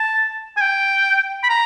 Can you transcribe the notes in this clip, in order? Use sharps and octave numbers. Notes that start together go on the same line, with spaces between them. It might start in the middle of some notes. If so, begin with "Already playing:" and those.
Already playing: A5
G#5
G5
B5
A#5